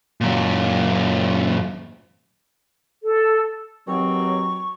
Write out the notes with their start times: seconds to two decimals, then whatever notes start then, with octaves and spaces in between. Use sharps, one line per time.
0.21 F#2 A#2
3.03 A4
3.88 D#2 B2 F#3 C4 C#6